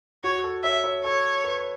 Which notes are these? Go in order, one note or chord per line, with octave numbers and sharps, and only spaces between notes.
F#4 C#5
A4
C#5 E5
C#5
A4 C#5
B4